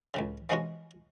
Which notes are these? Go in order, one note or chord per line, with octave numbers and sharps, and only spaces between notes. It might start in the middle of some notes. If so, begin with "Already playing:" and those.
C#2 A2 C#3
E3 F3 G#3 B3 C#4 F#4